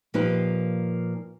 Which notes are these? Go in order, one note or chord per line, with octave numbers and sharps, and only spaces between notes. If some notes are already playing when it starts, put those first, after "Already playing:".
A#2 F3 A#3 D#4 G4 B4